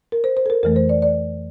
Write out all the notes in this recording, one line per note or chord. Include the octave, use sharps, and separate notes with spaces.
A#4
C5
C5
A4
A#4
F2 E3 A3 A#4
C5
D5
D5